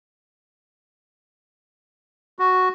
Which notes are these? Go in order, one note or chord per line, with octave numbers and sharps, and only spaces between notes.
F#4